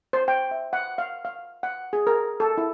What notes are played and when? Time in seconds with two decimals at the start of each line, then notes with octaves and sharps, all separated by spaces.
0.13 C5
0.28 G5
0.51 E5
0.73 F#5
0.98 F5
1.25 F5
1.63 F#5
1.93 G#4
2.07 A#4
2.40 A4
2.57 E4